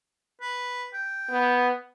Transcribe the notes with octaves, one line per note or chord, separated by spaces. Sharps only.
B4
G5
B3